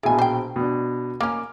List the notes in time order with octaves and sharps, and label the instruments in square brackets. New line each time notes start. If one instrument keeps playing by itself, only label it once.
[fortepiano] A#1 B2 G#4 [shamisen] E4 G#5
[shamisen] C5 G5
[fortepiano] B2 D4
[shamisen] A#3 C#4 [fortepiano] D6 F6